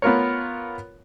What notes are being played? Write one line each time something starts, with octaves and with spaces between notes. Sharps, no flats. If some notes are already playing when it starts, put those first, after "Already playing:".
B3 F4 A#4 C#5